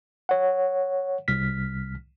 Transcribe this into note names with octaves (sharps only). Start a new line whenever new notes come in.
C#5 F#5
C2 F6 B6